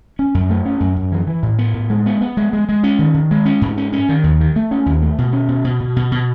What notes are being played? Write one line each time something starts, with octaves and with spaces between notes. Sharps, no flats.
C#4
F#2
A3
C#4
F#2
F#2
E3
E3
A2
B3
A2
G#3
B3
B3
G#3
G#3
G#3
C#4
D#3
D#3
G#3
C#4
G#2
C#4
C#4
D#3
D#2
D#3
A3
C#4
D#2
A3
B2
C#4
B2
B2
B2
B2
B2